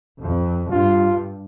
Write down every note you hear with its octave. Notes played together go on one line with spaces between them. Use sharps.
F2
G2 F4